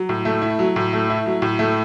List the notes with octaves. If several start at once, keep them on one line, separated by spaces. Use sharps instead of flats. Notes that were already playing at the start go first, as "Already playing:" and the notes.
Already playing: F#3
A2
A3
E4
F#3
A2
A3
E4
F#3
A2
A3